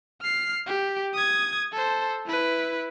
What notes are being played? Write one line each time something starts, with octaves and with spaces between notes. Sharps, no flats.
F6 C7
G4
D#6 G#6
A4 C5
E4 B4